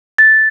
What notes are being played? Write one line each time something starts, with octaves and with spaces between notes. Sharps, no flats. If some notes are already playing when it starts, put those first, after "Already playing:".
A6